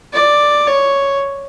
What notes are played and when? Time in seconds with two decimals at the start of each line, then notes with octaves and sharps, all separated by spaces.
0.13 D5
0.67 C#5